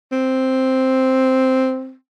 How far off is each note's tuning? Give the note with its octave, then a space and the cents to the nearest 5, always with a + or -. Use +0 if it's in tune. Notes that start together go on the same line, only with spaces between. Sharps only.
C4 +0